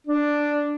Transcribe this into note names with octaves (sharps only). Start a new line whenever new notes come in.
D4